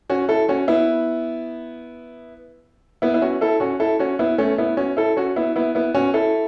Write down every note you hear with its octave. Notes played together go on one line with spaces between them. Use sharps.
C#4 F#4
E4 A4
C#4 F#4
B3 E4
B3 E4
E4
C#4 F#4
E4 A4
C#4 F#4
E4 A4
C#4 F#4
B3 E4
A3 C#4
B3 E4
C#4 F#4
E4 A4
C#4 F#4
B3 E4
B3 E4
B3 E4
C#4 F#4
E4 A4